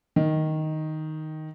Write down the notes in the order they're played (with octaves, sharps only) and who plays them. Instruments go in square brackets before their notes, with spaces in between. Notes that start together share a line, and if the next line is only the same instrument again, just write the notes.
[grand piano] D#3